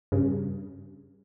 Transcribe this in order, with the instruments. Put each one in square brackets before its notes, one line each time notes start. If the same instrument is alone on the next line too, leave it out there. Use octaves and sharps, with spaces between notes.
[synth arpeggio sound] G2 C#3